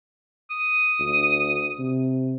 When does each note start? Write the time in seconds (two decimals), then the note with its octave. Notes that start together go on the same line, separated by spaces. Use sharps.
0.50 D#6
1.00 D2
1.79 C3